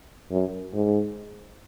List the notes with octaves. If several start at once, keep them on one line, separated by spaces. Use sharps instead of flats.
F#2
G#2